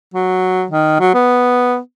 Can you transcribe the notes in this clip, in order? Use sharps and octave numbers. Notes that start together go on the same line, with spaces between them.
F#3
D#3
F#3
B3